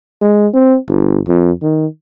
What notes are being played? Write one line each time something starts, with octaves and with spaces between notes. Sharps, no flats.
G#3
C4
G1
F2
D#3